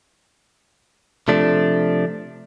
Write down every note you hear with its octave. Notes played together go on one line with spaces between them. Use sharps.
C3 F3 A3 D4